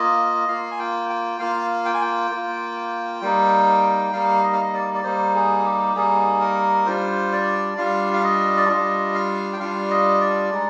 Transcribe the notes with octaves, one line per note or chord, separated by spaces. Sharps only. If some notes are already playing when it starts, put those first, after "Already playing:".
Already playing: A#3 F4 D#5
A#3 F4 F5
G#5
G5
G5
A#3 F4 F5
G5
G#5
G5
A#3 F4
G3 A#3 D#4
G3 A#3 D#4 F5
D#5
F5
D#5
D5
D5
G3 A#3 D#4 C5
G#4
G4
G3 A#3 D#4 G#4
A#4
G3 D4 F4 C5
D5
G3 D4 F4 F5
F5
D#5
D5
G3 D4 F4 D#5
F5
G5
G3 D4 F4 F5
D#5
D5
G#3 D#4